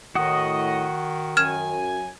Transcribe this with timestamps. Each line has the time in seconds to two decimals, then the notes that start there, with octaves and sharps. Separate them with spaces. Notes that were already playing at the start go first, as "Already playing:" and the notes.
0.15 A2 D#3 F#4 D#5 F#5 D#6
1.37 F#2 G#5 F6 G#6 E7